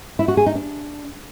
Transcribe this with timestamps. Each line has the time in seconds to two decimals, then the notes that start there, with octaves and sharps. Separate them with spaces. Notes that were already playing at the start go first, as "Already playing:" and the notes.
0.19 E4
0.28 F#4
0.37 G#4
0.46 D#4
0.55 D4